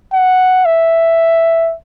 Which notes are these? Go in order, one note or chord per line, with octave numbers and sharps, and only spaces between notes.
F#5
E5